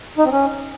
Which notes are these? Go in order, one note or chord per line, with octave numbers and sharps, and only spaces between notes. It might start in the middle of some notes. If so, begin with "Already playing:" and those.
D#4
C4
C#4